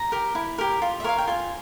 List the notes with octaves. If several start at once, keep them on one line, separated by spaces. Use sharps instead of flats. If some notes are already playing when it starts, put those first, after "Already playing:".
Already playing: A#5
G4 A#4
E4
G4 A#4
F4
E5
A#4 C#5 F5
G5
F4 G#5